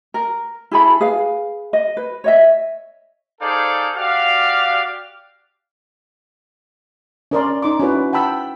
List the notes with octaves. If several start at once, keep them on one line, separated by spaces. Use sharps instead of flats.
A#4
E4 G#4 A4 B5
G#4 B4 F5
D#5
B4
C#5 D#5 E5
D#4 G#4 A4 C5 D5 F5
F#4 G4 D5 F5
C#4 A#4 D5 C6
D#4 C6 D6
C#4 E4 F#4 B4
F#5 G5 A5 B5 E6